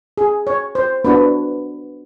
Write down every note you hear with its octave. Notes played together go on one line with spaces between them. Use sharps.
G#4
C#5
C5
B3 D4 F#4 B4